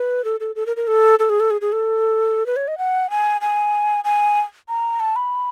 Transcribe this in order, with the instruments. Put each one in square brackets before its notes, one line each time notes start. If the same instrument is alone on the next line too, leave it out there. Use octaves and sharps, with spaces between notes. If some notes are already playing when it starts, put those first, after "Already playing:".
Already playing: [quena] B4
A4
A4
A4
A#4
A#4
A4
A4
G#4
A4
G#4
G#4
A4
B4
C#5
D#5
F#5
G#5
G#5
G#5
A#5
A5
B5